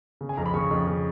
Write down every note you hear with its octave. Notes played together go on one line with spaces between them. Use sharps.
C#3
G#5
F2 A#5
B5
C#3 C#6
F2
C#3